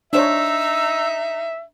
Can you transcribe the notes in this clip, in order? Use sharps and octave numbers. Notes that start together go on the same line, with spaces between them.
D4 D#4 C5 C#5 E5 E6